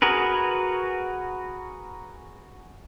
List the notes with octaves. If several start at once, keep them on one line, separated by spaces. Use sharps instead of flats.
F#4 G#4 A#4 B4